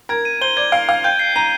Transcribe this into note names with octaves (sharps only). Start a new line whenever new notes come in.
A#4 G#6
D#7
C5 G7
D5 G#6
F5 D7
F5 G#6
G5 G6
C7
A#5 D#7